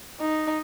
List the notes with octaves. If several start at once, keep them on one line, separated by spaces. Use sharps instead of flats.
D#4